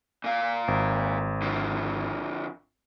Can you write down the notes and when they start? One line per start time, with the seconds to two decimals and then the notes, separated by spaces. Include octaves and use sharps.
0.24 A#2 F5
0.68 G#1
1.42 D3 F3